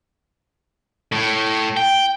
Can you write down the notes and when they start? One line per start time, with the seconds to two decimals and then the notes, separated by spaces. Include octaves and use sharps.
1.12 A2
1.77 G5